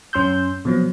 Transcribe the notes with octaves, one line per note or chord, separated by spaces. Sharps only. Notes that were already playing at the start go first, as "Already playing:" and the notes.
F#2 C#4 C6 E6 G6
B2 F3 F#3